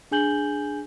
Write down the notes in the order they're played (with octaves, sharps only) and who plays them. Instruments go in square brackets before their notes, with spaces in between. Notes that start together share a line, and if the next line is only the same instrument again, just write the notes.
[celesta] D4 G#4 G#5 G6 F#7 G7